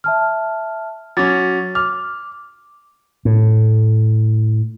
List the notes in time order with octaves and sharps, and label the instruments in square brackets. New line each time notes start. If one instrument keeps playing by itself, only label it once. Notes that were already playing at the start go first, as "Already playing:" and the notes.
[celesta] E5 A5 F6
[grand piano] F#3 C#4 [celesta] D6 A6
[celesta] D6 [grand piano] F6
[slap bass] A2